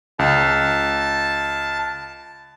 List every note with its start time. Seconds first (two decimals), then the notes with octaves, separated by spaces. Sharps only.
0.19 C#2 A5